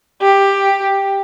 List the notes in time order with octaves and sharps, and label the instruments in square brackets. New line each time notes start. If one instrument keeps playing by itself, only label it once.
[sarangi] G4